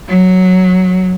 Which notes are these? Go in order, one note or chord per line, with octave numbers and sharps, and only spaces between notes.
F#3